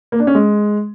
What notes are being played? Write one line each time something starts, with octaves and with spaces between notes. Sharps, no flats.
A#3
D4
C#4
G#3